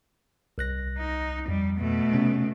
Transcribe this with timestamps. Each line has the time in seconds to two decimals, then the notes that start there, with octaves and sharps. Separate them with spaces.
0.58 C2 F#6 A#6
0.98 D#4
1.48 F2 G3
1.78 B2 A3
2.13 C3 B3 C#4